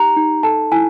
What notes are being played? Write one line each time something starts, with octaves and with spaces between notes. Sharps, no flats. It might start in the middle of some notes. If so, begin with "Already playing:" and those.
Already playing: D#4 G4 A#5
D#4
A4 A5
E4 G#5